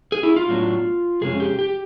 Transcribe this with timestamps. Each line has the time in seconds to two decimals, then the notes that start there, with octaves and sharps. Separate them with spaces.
0.12 G#4
0.23 E4
0.36 F4
0.48 A2 F#3 B3 D4
1.21 F2 C3 G#3 C#4 G#4
1.40 G4
1.59 G4